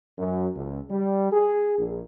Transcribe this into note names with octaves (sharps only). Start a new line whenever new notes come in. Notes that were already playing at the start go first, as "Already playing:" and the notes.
F#2
C#2
G3
G#4
A#1